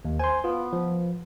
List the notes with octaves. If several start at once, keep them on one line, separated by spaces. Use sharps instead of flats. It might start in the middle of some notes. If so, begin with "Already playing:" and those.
D#2
C5 G#5 C6
B3 F4
F3